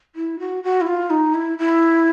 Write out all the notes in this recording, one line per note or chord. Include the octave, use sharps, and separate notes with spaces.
E4
F#4
F#4
E4
F4
D#4
E4
E4